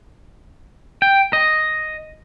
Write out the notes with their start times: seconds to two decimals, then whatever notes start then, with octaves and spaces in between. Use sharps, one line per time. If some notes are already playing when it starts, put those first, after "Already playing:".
1.02 G5
1.33 D#5